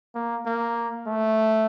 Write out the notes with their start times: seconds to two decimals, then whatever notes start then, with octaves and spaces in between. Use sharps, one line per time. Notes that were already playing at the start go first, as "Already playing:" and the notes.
0.15 A#3
0.46 A#3
1.07 A3